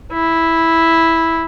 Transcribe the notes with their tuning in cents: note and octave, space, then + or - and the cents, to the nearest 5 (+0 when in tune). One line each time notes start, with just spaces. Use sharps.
E4 -5